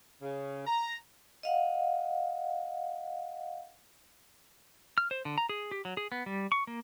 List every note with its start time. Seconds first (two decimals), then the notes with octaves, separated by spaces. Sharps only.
0.21 C#3
0.66 A#5
1.43 D#5 F5 F#5
4.98 F6
5.11 C5
5.25 D3
5.38 A#5
5.49 G#4
5.71 G4
5.85 F#3
5.97 G#4
6.12 B3
6.26 G3
6.52 C#6
6.67 A#3